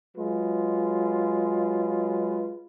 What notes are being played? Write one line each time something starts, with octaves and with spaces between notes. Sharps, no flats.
F#3 G#3 F4 B4